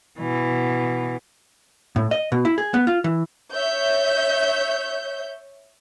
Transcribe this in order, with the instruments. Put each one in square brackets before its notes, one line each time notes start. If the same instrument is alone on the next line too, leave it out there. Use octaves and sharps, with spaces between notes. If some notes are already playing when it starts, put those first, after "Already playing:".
[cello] B2 E3
[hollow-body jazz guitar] A2
D#5
B2
E4
G#4
B3
F4
E3
[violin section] C#5 E5 G6